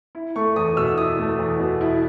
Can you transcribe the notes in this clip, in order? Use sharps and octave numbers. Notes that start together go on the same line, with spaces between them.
E4
A3 C#6
E2 D#6
B2 E6
E4 D#6
A3
E2
B2
E4